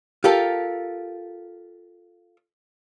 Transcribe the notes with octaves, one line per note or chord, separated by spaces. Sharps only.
F4 G4 A4 A#4